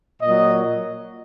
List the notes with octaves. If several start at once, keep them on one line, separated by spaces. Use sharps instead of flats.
A#2 F#3 D#5